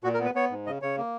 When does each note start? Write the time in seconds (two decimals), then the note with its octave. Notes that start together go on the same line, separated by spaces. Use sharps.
0.04 A#2 F#4
0.14 A#4
0.19 B3
0.25 B4
0.35 B3 C#5
0.51 G#2
0.66 C#3 D#5
0.82 C#3 C#5
0.98 A#3